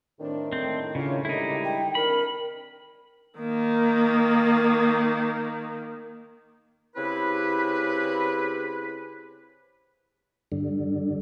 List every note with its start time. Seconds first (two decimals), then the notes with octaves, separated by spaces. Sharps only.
0.20 A2 D#3 C4 D4
0.53 G#2 A3 C4 D4
0.95 C#3 D4 F4 C#5
1.25 D3 G3 G#3 D#4 E4
1.64 G5
1.95 D#3 C4 D4 A#4 B5
3.39 D#3 A#3
6.96 C#3 C4 E4 G4 B4
10.52 G2 D3